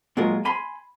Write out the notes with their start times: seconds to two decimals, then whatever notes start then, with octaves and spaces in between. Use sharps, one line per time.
0.17 A#2 F#3 G#3 F4 A#4
0.45 G#5 B5 C6